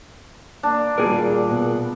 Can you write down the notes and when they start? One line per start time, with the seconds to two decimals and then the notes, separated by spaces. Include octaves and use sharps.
0.63 A#3 D4
0.98 A#2 D#3 G3 G#4 A#4
1.47 B2 B3